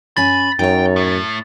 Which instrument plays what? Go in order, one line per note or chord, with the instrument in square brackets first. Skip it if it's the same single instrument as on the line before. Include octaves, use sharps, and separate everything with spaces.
[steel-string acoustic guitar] F#2 C#4 G#5 [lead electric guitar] B5 [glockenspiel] A6
[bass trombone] F#2 [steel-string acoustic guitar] D#4 C#5 [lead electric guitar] G5
[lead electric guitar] A2